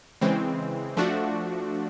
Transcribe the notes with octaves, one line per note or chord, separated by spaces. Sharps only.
C#3 E3 G#3 C4
F3 A3 D4 F#4